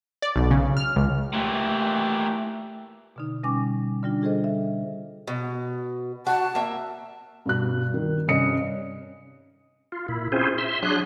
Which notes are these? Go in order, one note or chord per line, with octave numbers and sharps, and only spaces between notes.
D5
B1
C#3
F6
C#2
A#2 E3 A3 G4
B2 D3 D#4
B2 G3 C#4 G#5 D6
D3 G3 D4 F4
F4 G#4 A4 C5 D#5
E5
B2
F#4 A5
A#3 E5
G2 B2 F#6
D#3
G2 C3 C#4 D#5 D#6 C#7
F4
A#2 E4
C4 C#4 E4 F4 G#4 C5
E5 C6
F#3 D4 G#4 C6 F#6